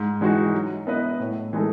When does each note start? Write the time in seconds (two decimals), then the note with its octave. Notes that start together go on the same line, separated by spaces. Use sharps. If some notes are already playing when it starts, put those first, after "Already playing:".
Already playing: G#2
0.21 E3 G#3 D#4 F#4
0.54 F#3
0.87 B3 E4 B4 D#5
1.20 A2
1.53 E3 G#3 D#4 A4